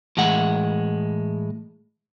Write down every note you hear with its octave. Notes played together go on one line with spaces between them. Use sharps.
A2 E3 G#3 F#5